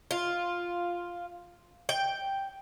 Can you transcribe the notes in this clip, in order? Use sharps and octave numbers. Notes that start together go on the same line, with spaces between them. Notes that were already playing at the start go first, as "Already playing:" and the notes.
F4
G5